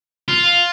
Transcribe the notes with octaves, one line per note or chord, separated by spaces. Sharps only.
F4